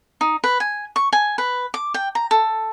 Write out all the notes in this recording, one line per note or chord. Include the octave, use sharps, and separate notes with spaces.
D#4
B4
G#5
C#6
G#5
B4
D6
G5
A#5
A4